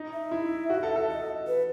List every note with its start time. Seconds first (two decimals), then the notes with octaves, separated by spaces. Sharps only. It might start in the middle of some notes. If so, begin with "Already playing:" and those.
Already playing: D#4
0.13 E5
0.31 E4
0.70 F#4
0.83 A4
0.96 A4
1.09 D#5
1.47 B4